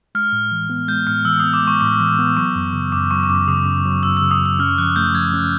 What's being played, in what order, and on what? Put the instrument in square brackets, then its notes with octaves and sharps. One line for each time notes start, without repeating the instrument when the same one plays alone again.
[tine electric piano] G#3 [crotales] F6
[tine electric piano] A2
E3
B3
[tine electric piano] G#3 [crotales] G6
[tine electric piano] A2 [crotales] F6
[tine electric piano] E3 [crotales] E6
[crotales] D#6
[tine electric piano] B3
[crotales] D6
[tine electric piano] G#3 [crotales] C#6
[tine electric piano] A2 [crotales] D6
[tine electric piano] E3
B3
[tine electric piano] F#3 [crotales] C#6
[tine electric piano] F#2
C#3
[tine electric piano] F#2 [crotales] D6
[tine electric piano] F#3 [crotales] C#6
[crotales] C#6
[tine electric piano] F#2 [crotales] D6
[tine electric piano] C#3 [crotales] D#6
[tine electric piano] F#2
F#3
[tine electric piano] F#2 [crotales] E6
[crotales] E6
[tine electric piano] C#3
[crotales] D#6
[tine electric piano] F#2 [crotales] E6
[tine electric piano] C#4 [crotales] F6
[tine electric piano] F3 [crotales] F#6
[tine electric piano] A3 [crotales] G6
[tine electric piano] F3 [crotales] G#6
[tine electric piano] C#4